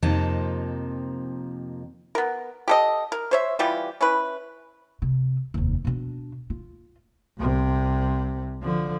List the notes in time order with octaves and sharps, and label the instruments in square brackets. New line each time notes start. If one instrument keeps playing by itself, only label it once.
[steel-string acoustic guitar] F2 C3 F3 A#3 D#4 A5
[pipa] B3 A#4
G4 A4 D#5
A#4
C5 C#5 E5
E3 G3 F4 G4
C#4 E4 B4
[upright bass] C3
F1 D#2
B2 D4
F4
[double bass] C2 C3
D3 F3